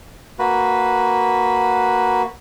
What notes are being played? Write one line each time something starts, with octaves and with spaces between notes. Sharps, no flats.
A#3 F#4 B4